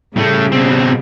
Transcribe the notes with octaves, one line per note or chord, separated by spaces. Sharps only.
A2 C#3 G3 A3
B2 C4